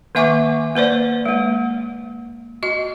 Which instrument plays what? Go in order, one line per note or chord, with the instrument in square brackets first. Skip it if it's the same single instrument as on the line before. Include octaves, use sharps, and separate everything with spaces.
[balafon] D#3 A#3 E5 G#5 C#6 D6
A#3 B4 C5 D5
G#3 A#3
F#4 D#5